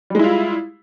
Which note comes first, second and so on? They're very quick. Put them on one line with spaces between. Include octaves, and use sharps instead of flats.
G3 G#3 E4 F4